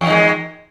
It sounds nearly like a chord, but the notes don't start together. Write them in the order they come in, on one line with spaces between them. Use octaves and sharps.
E2 D#3 G#3